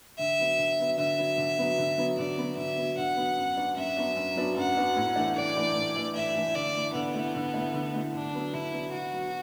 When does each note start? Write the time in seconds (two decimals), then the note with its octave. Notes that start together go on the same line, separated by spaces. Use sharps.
0.18 D3 E5
0.39 F#3 B3
0.58 D3
0.79 F#3 B3
0.98 D3 E5
1.18 F#3 B3
1.38 D3
1.59 F#3 B3
1.78 D3
1.98 F#3 B3
2.18 D3 D5
2.38 F#3 B3
2.57 D3 E5
2.78 F#3 B3
2.97 D3 F#5
3.17 F#3 B3
3.37 F#2
3.57 F#3 B3 D4 F#4
3.77 F#2 E5
3.97 F#3 B3 D4 F#4
4.16 F#2
4.36 F#3 B3 D4 F#4
4.56 F#2 F#5
4.76 F#3 B3 D4 F#4
4.96 A2
5.16 E3 A3 D4
5.35 A2 D5
5.56 E3 A3 D4
5.75 A2
5.96 E3 A3 D4
6.15 A2 E5
6.35 E3 A3 D4
6.55 D3 D5
6.75 A3 E4
6.94 D3 B3
7.14 A3 E4
7.35 D3
7.54 A3 E4
7.74 D3
7.94 A3 E4
8.14 D3 D4
8.33 F#3 B3
8.53 D3 E4
8.74 F#3 B3
8.93 D3 F#4
9.13 F#3 B3